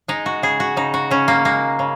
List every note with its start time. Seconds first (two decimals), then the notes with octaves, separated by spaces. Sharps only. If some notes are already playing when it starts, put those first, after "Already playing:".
0.08 G#3 D#4
0.26 F#4
0.43 C#3 G#4
0.60 F#4
0.77 C#3 D#4
0.94 F#4
1.11 C#3 C#4
1.28 A#3
1.45 G#3 A#3
1.79 C#3